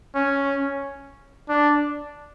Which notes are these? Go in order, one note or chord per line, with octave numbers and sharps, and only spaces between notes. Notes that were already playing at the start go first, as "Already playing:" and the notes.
C#4
D4